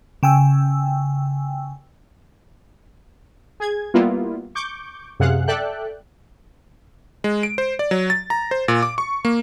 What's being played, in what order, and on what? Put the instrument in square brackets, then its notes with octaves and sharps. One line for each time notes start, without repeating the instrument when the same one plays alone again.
[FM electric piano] C#3 G5 G#5 E6
[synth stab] G#4 G#6
G3 A#3 B3 E4 F4
C#6 D6 G6
F#2 C3 G#4 F5 F#5 F#6
A4 D5 E5 G5 F#6
[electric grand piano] G#3
D7
C5
D5
F#3
A6
A#5
C5
A#2
D6
C#6
A#3